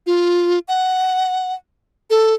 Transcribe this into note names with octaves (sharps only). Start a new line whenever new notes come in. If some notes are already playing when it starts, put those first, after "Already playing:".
F4
F#5
A4